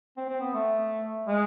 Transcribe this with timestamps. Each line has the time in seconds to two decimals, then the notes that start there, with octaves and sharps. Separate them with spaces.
0.17 C4
0.29 C4
0.41 B3
0.54 A3
1.27 G#3